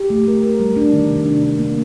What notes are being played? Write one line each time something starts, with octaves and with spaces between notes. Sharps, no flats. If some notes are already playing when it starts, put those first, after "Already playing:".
Already playing: G4
A3
A#4
A#4
G3
D4
D#3
C3
D4
D4
A#3